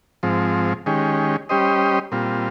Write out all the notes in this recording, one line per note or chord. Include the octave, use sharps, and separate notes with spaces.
G#2 F3 C4
D#3 G#3 C#4 G4
G3 C#4 G4 C5 D#5
A#2 G3 C4 F4